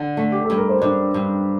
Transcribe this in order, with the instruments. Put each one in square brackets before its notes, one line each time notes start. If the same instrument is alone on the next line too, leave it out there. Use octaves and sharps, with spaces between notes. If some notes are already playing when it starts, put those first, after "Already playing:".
Already playing: [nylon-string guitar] D3
A3
[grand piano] G4
[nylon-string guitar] G2 [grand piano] A4
[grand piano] A#4
C5
[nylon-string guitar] G2 [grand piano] D4 D5
[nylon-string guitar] G2